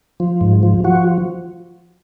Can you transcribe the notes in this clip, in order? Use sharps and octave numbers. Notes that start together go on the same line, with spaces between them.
F3
G#2
F3
F3 F#4